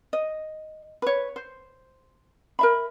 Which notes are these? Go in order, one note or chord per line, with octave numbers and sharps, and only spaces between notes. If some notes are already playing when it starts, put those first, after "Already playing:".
D#5
B4 C#5
C5
A#4 E5 B5